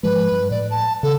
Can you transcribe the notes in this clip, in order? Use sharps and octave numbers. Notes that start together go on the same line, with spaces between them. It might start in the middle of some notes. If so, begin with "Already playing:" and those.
G#2 F3 G#3 B4
G2
A2 D5
A5
C#3 A4